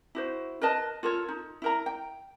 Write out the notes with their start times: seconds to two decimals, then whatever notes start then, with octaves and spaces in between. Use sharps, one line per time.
0.15 E4 F#4 C5
0.62 A#4 B4 D#5 A5
1.03 F4 A4 A#4 C#5
1.28 D#4
1.62 E4 A#4 A#5
1.86 G5